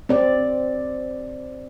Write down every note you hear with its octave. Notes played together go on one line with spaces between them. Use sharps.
C4 D5